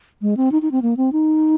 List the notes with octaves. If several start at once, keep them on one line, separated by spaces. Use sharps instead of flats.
G#3
C4
D#4
D#4
C4
A#3
C4
D#4